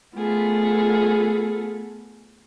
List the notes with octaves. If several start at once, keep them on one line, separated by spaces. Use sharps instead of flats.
A3 B3 F4 G#4 A4